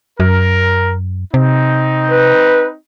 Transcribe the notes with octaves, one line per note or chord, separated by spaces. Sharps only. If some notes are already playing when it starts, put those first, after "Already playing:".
F#2 A#4
C3 C4 D#4
B4